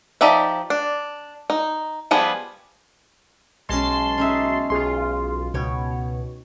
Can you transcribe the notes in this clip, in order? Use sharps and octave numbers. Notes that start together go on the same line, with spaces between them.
F3 D#4 G4 D5 E5
D4
D#4
F3 G3 B3 G#4
B1 G#3 C#4 A5 C6
C#4 D#4 E5
B1 F4 G#4 C6
C#2 B2 C#5 G5